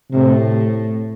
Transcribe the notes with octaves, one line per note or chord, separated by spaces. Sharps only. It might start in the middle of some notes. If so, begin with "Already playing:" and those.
A2 C3